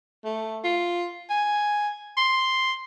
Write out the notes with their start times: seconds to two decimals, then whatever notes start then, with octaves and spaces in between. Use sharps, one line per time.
0.25 A3
0.64 F4
1.30 G#5
2.17 C6